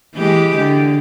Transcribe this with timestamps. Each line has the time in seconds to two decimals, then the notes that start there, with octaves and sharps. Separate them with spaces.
0.16 E3 G#3 G4
0.57 D3